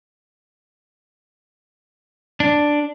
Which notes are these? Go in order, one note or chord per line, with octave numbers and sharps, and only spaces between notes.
D4